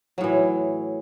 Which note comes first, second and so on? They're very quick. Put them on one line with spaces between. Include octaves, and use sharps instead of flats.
F#3 A2 E3